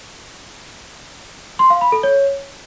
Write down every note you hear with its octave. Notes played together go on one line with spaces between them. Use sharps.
C6
F5
B5
A4
C#5